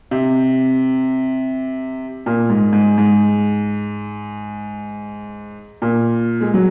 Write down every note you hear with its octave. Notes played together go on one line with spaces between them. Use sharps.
C3
A#2
G#2
G#2
G#2
A#2
G#3
F#3